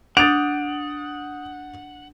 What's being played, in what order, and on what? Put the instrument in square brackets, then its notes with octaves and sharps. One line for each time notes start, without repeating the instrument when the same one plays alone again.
[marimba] D4 [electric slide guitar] F#5 [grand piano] D#6 G6 F7 [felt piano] A6 D7